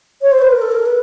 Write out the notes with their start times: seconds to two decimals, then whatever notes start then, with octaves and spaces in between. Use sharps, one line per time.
0.21 C#5
0.32 C5
0.42 B4
0.51 A#4
0.62 A4
0.72 A#4
0.86 B4